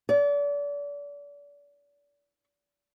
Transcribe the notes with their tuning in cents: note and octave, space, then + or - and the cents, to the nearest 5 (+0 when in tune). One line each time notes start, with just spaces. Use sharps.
D5 -35